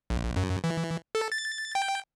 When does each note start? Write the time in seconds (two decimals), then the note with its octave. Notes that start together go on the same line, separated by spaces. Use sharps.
0.10 A#1
0.36 F#2
0.64 E3
1.15 A4
1.32 A6
1.75 G5